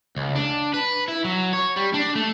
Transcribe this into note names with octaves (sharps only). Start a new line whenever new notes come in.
C#2
D4
B4
E4
F#3
C#5
G3
D4
A3